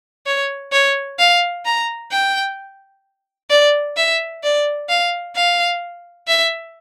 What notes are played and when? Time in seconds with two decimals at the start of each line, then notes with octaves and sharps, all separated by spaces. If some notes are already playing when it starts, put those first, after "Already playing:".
0.26 C#5
0.72 C#5
1.19 F5
1.65 A#5
2.12 G5
3.50 D5
3.96 E5
4.43 D5
4.89 F5
5.35 F5
6.27 E5